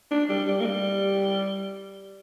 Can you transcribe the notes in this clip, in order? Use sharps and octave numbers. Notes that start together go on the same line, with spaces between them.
D4
G3
G3
A#3
G3